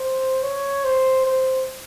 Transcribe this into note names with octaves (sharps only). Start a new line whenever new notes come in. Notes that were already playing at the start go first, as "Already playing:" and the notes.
Already playing: C5
C#5
C5
C5